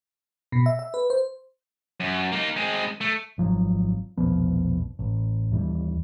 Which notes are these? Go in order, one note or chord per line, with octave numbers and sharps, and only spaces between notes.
B2
E5
E5
B4
C5
F#2
A#3 D#4
G#3 C4
A3
G#1 F3 F#3
E1 A#1 F3 B3
A1
D#2 E3 G3